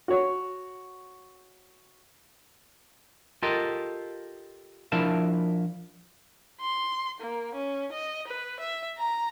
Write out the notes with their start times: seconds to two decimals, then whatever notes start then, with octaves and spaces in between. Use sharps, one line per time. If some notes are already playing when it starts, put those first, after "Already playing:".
0.08 F#4 C#5
3.43 F4 G4 A4 A#4 D#5
4.92 F3 D4 E4 A#4 A5
6.61 C6
7.20 A#3
7.55 C#4
7.92 D#5
8.27 B4
8.60 E5
8.98 A#5